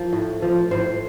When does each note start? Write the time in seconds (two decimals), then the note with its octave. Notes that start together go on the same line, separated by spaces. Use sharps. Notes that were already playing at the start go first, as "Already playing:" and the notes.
Already playing: F3 A#4
0.13 A2
0.42 F3
0.71 A2 C5